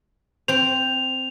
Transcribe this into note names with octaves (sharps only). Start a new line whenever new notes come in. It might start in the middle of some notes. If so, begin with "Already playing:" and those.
C4 C5 F7